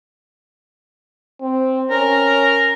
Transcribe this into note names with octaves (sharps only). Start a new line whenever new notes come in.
C4
C#4 A#4